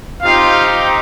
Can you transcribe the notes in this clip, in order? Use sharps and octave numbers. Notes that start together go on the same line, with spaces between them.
C4 D#4 F4 G4 F5